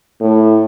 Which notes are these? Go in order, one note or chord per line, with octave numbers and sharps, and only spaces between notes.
A2